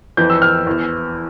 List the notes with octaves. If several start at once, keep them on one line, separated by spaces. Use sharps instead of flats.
F2 E3 G6
E6
F6
E2 E3